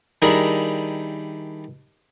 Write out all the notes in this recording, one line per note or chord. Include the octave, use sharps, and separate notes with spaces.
D#3 G3 D4 E4 G#4 A#4